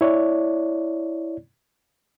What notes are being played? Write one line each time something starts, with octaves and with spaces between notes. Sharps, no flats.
E4 C#5 D5